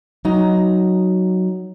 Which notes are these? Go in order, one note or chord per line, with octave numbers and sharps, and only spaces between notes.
F#3 D#4 A#5